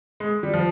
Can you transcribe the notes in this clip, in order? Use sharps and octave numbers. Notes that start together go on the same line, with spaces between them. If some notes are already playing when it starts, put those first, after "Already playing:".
G#3
G3
F3